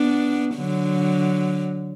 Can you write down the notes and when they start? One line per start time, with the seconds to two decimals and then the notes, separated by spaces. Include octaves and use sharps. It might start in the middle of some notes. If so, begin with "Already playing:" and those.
Already playing: B3 D4
0.56 D3 F#3